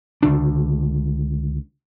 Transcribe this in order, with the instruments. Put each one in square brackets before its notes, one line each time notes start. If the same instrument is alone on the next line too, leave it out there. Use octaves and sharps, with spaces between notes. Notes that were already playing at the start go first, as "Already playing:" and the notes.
[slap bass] C#2 D3 D4